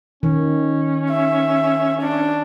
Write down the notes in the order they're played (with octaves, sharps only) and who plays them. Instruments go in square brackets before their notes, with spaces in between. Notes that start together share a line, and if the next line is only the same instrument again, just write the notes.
[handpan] D#3 [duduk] C#4
[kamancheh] E5
D4